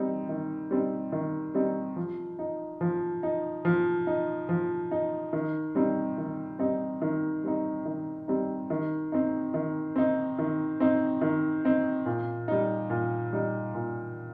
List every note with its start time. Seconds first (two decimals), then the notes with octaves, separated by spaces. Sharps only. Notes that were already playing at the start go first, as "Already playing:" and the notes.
Already playing: G3 C4 D#4
0.29 D#3
0.71 G3 C4 D#4
1.12 D#3
1.55 G3 C4 D#4
1.96 F3
2.39 D#4
2.81 F3
3.23 D#4
3.65 F3
4.07 D#4
4.49 F3
4.91 D#4
5.33 D#3
5.75 G3 C4 D#4
6.18 D#3
6.59 G3 C4 D#4
7.02 D#3
7.44 G3 C4 D#4
7.85 D#3
8.28 G3 C4 D#4
8.70 D#3
9.12 C4 D#4
9.54 D#3
9.96 C4 D#4
10.39 D#3
10.80 C4 D#4
11.22 D#3
11.65 C4 D#4
12.06 A#2
12.48 G3 D#4
12.90 A#2
13.33 G3 D#4
13.74 A#2